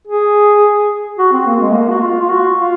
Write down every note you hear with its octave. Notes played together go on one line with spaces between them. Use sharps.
G#4
F#4
C4
A#3
G#3
A#3
F#4
F4
F4
F#4
F4